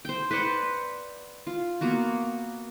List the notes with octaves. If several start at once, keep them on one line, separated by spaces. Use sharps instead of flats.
C5 G5
B4 C5 D5 F#5
F4
A#3 B3 F#4